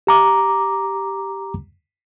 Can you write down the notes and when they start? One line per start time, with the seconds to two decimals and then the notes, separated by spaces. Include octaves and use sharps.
0.07 G4 A#5 D6